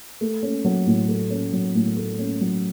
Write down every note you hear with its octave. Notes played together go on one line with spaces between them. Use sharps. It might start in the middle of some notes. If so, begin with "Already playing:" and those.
A3
C#4
F#3
A2
A3
C#4
F#3
A2
A3
C#4
F#3